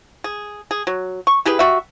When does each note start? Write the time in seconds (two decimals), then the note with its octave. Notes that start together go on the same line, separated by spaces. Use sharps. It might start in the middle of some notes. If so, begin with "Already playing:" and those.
0.24 G#4
0.71 G#4
0.87 F#3
1.27 C#6
1.45 E4 G4 G#4 B4
1.59 G3 F#4 E5